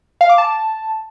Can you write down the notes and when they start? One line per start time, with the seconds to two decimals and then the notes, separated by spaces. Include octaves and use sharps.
0.21 F5
0.29 D6
0.38 A5